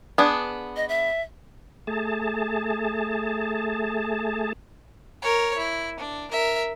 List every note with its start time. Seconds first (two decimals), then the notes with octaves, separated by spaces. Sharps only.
0.18 B3 D4 G#4
0.76 D#5
0.89 E5
1.87 A3 G#4 A5
5.22 A#4 C#5
5.57 E4
5.99 D4
6.31 A#4 E5